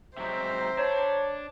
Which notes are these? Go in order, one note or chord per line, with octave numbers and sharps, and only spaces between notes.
C3 F#3 G#3 C5 E5 G5 A#5
D4 C#5